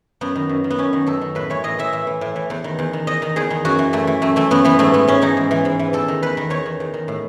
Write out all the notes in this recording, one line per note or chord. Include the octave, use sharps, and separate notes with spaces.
F#2 B3
D#3
F#2
D#3
B3
F#2 C#4
D#3
F#2 A4
D#3
A2 B4
E3 C#5
A2 D#5
E3 E5
A2 E5
E3
A2
E3
E2
D#3
E2
D#3
E2 D#5
D#3
E2 G#4
D#3
F#2 F#4
E3
F#2 A3
E3
F#2 A3
E3 A3
F#2 B3
E3 B3
G#2 A3
E3 B3
G#2 C#4
E3 D#4
G#2
E3
G#2
E3
E2 A4
D#3
E2 B4
D#3
E2 C#5
D#3
E2
D#3
A2